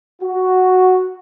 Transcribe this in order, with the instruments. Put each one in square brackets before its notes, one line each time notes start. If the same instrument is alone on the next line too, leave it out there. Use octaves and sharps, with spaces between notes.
[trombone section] F#4